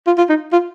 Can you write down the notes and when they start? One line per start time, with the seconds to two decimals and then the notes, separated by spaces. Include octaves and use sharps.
0.07 F4
0.18 F4
0.29 D#4
0.52 F4